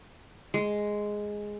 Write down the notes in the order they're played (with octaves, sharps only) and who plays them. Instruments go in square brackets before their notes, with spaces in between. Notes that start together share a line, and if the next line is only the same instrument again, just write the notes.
[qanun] G#3